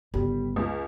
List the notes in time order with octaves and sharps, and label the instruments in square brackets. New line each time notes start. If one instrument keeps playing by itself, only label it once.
[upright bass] G1 C#3 [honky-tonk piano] G3
[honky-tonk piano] C#2